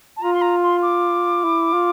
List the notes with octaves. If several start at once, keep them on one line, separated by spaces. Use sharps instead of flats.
A5
F4 A#5
C6
A#5
C6
D6
E4
F4